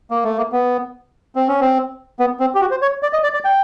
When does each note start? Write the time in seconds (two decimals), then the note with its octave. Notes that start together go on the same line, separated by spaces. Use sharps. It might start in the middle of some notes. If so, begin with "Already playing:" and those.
0.10 A#3
0.24 A3
0.37 A#3
0.52 B3
1.36 C4
1.48 C#4
1.61 C4
2.19 B3
2.40 C4
2.55 G4
2.61 F#4
2.71 C5
2.82 C#5
3.03 D5
3.13 D#5
3.23 D5
3.34 D5
3.45 G5